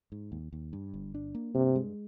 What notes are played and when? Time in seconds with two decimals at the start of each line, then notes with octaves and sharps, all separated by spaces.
0.12 G#2
0.32 D#2
0.53 D#2
0.73 G2
0.94 G1
1.15 D4
1.35 A#3
1.54 G2 C3
1.76 G#3